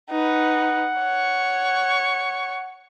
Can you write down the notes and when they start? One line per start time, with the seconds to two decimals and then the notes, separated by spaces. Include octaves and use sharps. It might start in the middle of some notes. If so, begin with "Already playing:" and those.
0.10 D#4 B4 F#5
1.00 C#5 C#6